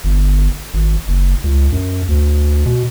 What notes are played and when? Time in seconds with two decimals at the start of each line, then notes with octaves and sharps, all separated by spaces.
0.04 G1
0.74 G#1
1.08 F#1
1.44 C#2
1.72 F#2
2.08 D2
2.66 B2